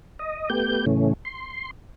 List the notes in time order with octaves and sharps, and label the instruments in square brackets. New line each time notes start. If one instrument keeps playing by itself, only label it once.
[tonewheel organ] D#5
A3 B3 G4 G6
A2 C#3 E3 A3 C#4
C6